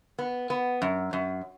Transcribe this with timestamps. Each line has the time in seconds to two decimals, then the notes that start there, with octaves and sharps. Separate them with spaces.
0.19 B3
0.50 B3
0.82 F#2
1.13 F#2